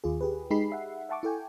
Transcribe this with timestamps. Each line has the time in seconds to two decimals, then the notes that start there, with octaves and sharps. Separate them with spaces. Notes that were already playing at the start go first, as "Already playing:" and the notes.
0.04 D#2 F4 G#4
0.21 G4 G#4 B4
0.50 G#3 D#4 G4 G#4 B5 C7
0.72 E5 F#5
1.09 E5 F#5 A5 C#6 D6
1.23 E4 A4 G5 G#5